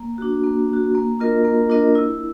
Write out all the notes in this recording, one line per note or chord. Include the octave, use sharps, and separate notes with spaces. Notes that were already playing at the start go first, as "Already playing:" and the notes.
Already playing: A#3
D4 F#4
A#3
D4 F#4
A#3
D4 F4 A#4 D#5
A#3
D4 F4 A#4 D#5
E4